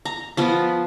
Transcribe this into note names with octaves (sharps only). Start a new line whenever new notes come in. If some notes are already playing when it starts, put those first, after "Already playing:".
A#5
F3 B3 F4